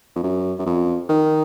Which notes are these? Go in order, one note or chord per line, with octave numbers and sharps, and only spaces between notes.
F2
F#2
F#2
F2
D#3